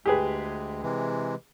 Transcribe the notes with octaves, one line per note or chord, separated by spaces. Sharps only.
D2 G#3 G4 G#4 B4
C3 E3 G#3